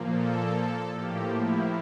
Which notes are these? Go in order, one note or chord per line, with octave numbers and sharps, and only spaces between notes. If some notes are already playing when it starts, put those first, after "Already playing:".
Already playing: A#2 F3 A#3
A4
A2 F3 A#3 G4
E4